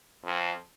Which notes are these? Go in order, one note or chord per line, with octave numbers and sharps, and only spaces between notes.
F2